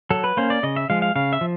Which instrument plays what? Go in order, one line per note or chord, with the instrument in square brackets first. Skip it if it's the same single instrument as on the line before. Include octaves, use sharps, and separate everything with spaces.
[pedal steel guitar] F#3 A4
B4
A#3 C#4 C5
D5
C#3 D#5
E5
F3 G#3 F5
F5
C#3 F5
E5
F3